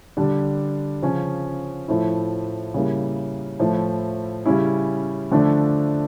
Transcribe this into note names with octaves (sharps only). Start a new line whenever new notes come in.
D3 G3 D4
C#3 F3 C#4
A2 F3 A3 E4
C#3 G3 A#3 E4
A2 F3 A3 E4
C#3 G3 C#4 E4
D3 F3 A3 D4